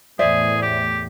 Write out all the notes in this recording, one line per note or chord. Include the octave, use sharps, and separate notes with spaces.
E2 A2 G#4 C5 D5 E5
G4